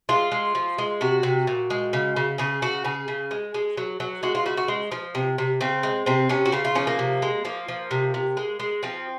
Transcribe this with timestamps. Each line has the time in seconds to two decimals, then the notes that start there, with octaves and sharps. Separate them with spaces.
0.09 G#3 F4
0.32 G#3
0.55 F3
0.78 G#3
1.01 C3 F#4
1.23 C3
1.47 A#2
1.70 G#3
1.93 C#3
2.16 C#3
2.38 C#3 G#4
2.62 C#3 F#4
2.85 C#3 G#4
3.08 C#3
3.31 G#3
3.54 G#3
3.77 F#3
4.00 F#3
4.23 G#3 F#4
4.35 F4
4.46 C#3 F#4
4.57 F#4
4.68 G#3
4.92 F3
5.15 C3
5.38 C3
5.61 C#3 C4
5.83 G#3
6.06 C3 C4
6.29 C3 C#4
6.46 F#4
6.52 C#3 F4
6.65 F4
6.75 F3 C#4
6.87 A#3
6.99 C3
7.22 G#3
7.45 F3 A#3
7.68 F3
7.91 C3
8.14 C3
8.37 G#3
8.59 G#3
8.83 F3 C4